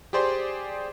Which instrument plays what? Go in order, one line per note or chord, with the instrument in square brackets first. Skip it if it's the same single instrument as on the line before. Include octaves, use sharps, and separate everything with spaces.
[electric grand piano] G4 G#4 C5 D5 C6